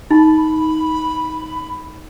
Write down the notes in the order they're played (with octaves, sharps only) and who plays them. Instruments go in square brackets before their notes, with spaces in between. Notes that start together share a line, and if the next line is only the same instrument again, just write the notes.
[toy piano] D#4 [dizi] B5